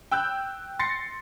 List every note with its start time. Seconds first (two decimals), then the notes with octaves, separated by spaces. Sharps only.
0.11 G5 E6 F#6 G6
0.79 C6 A6 A#6 C7 C#7